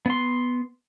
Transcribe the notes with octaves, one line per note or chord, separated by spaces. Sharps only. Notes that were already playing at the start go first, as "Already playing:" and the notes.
B3 C6